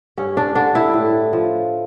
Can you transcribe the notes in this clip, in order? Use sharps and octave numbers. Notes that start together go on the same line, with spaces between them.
G2 C#4
D4
D3 D4
E4
A2
F3